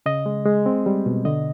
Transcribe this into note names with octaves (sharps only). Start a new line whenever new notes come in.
C#3 D#5
G#3
G#3
C4
G3
B2
D3 D#5